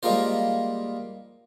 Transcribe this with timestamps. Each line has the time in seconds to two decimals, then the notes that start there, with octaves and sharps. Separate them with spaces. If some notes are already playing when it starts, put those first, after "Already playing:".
0.03 G3 G#3 A#3 F4 C5